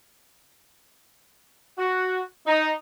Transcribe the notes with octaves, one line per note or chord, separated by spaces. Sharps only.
F#4
D#4